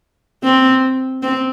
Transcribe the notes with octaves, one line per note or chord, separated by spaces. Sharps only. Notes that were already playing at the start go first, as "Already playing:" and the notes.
C4
C4